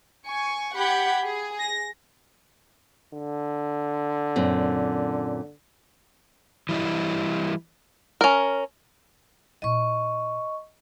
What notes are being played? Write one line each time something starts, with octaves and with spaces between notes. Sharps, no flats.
G#5 C#6
G4 F#5 B5 G6 G#6
G#4
A#6
D3
F#2 A#2 C4
E3 G3 E4 D#5
C#4 A#4
A#2 E4 D#5 C#6